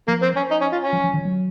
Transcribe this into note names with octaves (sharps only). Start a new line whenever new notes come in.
F3 A#3
C4
C#4
D#4
C#4
F4
C#4
F3
F3
D#3
F#3